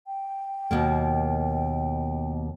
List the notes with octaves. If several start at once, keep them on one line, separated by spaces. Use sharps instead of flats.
G5
D#2 B2 A#3